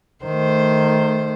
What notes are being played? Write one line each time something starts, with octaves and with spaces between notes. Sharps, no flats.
D#3 A3 C5